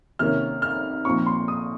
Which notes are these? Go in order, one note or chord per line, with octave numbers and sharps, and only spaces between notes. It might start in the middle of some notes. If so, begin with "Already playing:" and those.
C3 D#3 A#3 C#4 F6
F6
A#2 F3 C4 D#4 C#6
C6
D#6